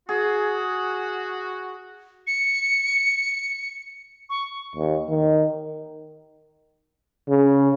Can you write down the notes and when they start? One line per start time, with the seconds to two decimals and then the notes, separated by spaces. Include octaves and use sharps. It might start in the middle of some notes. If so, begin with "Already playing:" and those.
0.09 F#4 G#4
2.27 C#7
4.29 C#6
4.76 D#2
5.10 D#3
7.28 C#3